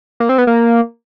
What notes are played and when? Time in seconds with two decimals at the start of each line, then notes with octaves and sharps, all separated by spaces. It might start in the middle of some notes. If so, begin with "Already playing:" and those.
0.20 A#3
0.29 C4
0.38 B3
0.47 A#3